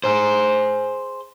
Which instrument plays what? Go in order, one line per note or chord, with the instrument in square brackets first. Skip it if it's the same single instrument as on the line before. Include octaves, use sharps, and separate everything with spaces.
[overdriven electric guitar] G#4 C5